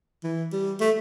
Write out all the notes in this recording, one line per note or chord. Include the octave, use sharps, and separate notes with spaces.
E3
G3
A3